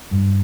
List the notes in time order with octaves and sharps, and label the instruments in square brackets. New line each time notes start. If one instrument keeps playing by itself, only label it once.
[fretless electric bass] G2